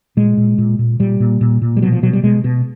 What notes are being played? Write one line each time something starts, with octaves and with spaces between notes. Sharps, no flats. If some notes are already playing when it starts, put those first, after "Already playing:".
A#2 G#3
A#2
A#2
A#2
A#2 G3
A#2
A#2
A#2
G3
B2 F#3
F3
B2 F#3
G3
B2 G#3
B2